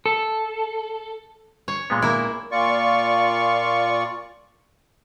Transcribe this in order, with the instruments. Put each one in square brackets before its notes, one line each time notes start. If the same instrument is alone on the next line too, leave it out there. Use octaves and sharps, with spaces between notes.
[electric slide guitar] A4
[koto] C#5
[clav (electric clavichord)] A#2 G#3 B3
[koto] A#3 E4
[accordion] A#2 F4 D5 C#6